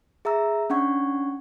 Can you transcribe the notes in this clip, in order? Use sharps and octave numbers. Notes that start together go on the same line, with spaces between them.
G#4 E5 A#5 E6
C#4 D4 F#5 C#6 G#6